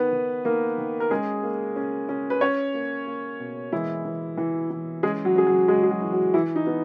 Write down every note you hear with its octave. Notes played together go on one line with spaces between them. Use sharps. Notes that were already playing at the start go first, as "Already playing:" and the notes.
Already playing: D#3 B3 B4
D#3
D#3 A#3 A#4
D#3
A#4
G#3 C#4 G#4
A#3
C#4
C#4
B4
C#4 C#5
A#3
A#3
B2
E3 G#3 E4
E3
E3
E3
G#3 C#4 G#4
F#3 F#4
C#4 G#4
F#3 F#4
G#3 G#4
G#4
F#3 F#4
E3
F#3 F#4
E3 E4
D#4
B3